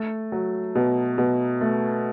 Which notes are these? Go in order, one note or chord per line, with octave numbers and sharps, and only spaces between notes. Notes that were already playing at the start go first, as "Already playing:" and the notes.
Already playing: A3
F#3
B2
B2
A3